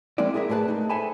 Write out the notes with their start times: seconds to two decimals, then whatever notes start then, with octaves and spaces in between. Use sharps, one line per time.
0.18 F3 G#3 A#3 C4 E4 D5
0.34 E4 G#4 A#4 D5 E5
0.50 A2 A3 G#4 B4 A5
0.68 A3 D#4
0.89 A4 C5 E5 G#5 A5 B5